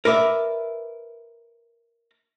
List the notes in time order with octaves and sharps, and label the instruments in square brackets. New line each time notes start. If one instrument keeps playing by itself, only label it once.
[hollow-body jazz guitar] A#4 B4 D5 E5